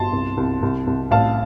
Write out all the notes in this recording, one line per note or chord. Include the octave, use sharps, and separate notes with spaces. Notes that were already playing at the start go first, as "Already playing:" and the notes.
Already playing: G1 A5 C6
C2
C2
C2
C2
A1 F5 A5